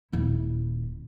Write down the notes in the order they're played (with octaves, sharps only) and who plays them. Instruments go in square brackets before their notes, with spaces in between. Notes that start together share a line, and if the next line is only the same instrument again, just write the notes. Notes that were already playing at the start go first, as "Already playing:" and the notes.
[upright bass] D#1 E4